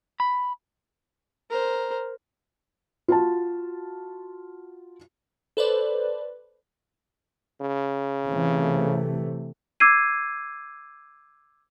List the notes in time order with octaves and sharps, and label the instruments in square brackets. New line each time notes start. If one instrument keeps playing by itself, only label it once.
[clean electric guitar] B5
[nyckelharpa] A#4 C5
[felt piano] F4 F#4 A5
[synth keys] A4 B4 C5 D5
[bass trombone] C#3
[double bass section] C3 E3 A3
[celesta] D6 E6 G#6 C7 D#7